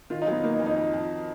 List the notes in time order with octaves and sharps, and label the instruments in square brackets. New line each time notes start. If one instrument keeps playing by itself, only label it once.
[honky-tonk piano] D#3 [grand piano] F4
[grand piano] D#4
[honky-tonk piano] F#3 [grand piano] B3
[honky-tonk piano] D#3 [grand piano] A#3
[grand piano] D#4
[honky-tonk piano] F2
[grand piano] D#4
[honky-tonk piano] F2
F2